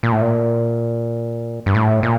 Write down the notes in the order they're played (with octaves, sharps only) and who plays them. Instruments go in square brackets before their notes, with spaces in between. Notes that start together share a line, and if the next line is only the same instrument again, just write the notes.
[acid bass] A#2
A2
A#2
G2
A2
A#2